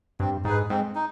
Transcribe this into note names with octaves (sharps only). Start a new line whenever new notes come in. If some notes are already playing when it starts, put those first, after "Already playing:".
G2 C4
G#2 D#4 G#4 B4
G#2 C4
D#4